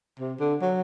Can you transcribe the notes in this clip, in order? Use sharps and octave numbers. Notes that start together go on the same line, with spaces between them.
C3
D3
F#3